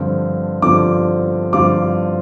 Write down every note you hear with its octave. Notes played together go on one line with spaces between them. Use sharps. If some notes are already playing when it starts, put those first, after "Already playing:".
Already playing: G2 D3 F3 C4 F4
G2 D3 F3 C4 F4 D6
G2 D3 F3 C4 F4 D6